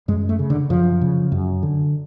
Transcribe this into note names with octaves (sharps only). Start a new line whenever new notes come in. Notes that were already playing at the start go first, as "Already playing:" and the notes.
F#2 G#3
A3
C#3
D3
F#2 F3
C#3
F#2
D3